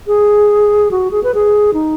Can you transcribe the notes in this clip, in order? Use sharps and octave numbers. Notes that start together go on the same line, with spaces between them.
G#4
F#4
G#4
B4
G#4
D#4